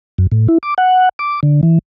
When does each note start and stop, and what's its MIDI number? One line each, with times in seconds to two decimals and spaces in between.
0.18 0.27 42
0.32 0.47 45
0.48 0.58 64
0.63 0.74 86
0.78 1.09 78
1.19 1.40 86
1.43 1.61 50
1.63 1.79 52